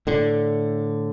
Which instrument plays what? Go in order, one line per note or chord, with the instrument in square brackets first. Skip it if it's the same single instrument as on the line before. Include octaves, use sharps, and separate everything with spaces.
[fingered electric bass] A2 D3